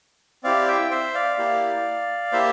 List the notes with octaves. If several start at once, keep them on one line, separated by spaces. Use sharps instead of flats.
C4 E4 G4 D5 F5
E5 G5
C5 E5
D5 F5
A#3 E4 G4
A#3 E4 G4 C5 E5